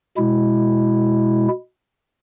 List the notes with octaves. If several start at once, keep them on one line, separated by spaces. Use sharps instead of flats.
B2 G#3 E4